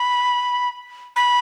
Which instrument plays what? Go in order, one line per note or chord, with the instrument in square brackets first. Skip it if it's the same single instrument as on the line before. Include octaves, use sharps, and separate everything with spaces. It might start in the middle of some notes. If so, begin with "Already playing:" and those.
Already playing: [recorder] B5
B5